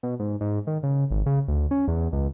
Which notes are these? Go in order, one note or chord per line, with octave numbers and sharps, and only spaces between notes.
B2
G#2
G#2
D#3
C#3
G#1
C#3
D2
C#4
E2
C#2